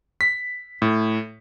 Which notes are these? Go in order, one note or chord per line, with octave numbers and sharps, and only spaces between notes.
B6
A2